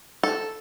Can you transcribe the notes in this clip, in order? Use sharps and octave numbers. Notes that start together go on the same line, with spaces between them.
A4